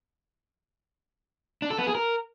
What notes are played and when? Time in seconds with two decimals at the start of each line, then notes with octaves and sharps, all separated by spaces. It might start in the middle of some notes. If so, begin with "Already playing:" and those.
1.62 D4
1.70 A4
1.79 B3
1.87 G#4
1.95 A#4